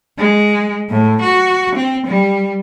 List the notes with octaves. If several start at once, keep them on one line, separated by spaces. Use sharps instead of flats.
G#3
A2
F#4
C4
G3